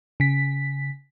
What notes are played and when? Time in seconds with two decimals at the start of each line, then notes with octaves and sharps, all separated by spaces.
0.20 C#3 B6